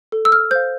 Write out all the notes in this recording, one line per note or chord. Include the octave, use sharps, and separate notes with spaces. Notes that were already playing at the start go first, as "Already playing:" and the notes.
A4
E6
F6
C5 F5 G6